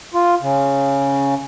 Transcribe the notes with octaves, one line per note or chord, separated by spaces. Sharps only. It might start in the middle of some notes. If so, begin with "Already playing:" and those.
F4
C#3